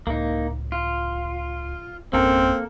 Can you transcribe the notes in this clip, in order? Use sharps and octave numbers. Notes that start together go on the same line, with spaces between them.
C#2 A2 A#3 D#4
F4
G#1 F2 A#3 C4 C#4 A4 A#4